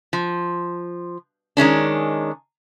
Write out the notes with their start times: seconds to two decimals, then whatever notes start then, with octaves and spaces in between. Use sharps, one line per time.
0.13 F3
1.57 D#3 G#3 C#4 D4